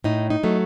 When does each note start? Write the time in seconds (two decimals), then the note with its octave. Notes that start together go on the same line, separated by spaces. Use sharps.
0.04 A2 D#4
0.30 D#4
0.43 F#3 A3